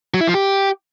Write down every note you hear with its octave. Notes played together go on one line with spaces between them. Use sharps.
F#3
E4
F3
G4